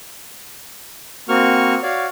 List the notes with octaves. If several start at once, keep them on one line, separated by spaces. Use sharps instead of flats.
A#3 C4 F#4 C#6 F6
F#4 C#5 D5 F5